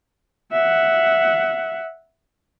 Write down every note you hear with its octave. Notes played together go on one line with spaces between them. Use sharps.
E5 F#5